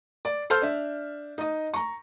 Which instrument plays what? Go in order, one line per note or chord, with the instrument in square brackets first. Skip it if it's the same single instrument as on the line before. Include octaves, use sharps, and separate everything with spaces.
[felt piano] D5
A4 C5 C6 F6 G6
D4 E5
D#4 D#5
A#5 C#6